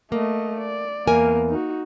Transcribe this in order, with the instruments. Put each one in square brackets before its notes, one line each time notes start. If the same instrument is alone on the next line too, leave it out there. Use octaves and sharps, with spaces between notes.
[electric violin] A3 D#5 [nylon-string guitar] A#3
[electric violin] D5
[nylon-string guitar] E2 A#4 G#5 [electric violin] A#3
[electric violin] D#4 F#4